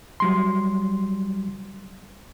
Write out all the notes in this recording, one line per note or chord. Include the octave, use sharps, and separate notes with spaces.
F#3 G3 C6